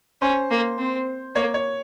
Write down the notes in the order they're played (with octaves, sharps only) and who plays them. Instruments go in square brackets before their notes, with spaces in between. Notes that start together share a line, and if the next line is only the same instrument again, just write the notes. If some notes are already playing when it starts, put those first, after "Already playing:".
[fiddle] C#4 [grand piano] C5
[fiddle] A#3
C4
[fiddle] A#3 [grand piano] C#5
[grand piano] C#5